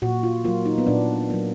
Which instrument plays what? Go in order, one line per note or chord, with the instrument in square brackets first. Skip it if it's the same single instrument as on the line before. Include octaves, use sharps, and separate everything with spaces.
[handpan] A#2 F#4
F4
F#3 A#3 F4
D#4
B3
A#2 D4
F#3 A#3